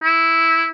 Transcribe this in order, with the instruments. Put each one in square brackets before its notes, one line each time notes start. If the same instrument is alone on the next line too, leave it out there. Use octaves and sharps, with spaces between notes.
[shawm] E4